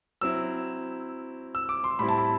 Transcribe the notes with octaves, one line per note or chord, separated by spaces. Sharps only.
F#3 C4 E4 E6
E6
D6
C6
A2 G3 C4 E4 B5
A5
B5